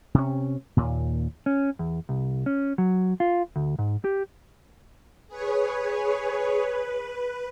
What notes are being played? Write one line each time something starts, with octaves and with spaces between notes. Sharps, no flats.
C3 C#4
D#2 A#2
C#4
E2
C2
C#4
F#3
F4
D2
G#2
G4
G#4 B4 C#5
B4